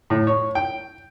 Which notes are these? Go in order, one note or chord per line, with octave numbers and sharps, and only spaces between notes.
A2
C#5
G5